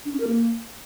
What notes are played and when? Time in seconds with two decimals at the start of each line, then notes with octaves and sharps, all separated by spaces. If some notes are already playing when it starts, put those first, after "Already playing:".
0.05 D4
0.13 C#4
0.20 A#4
0.27 A#3